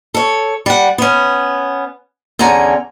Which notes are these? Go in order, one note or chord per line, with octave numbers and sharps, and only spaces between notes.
A4 C#5
G3 F#5
B3 C#4
E2 D3 C#4 G#5 A#5